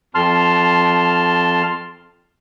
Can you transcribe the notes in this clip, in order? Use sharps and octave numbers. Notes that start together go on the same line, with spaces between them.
F2 A5 C6 F6